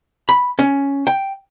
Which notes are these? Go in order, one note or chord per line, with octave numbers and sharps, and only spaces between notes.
B5
C#4
G5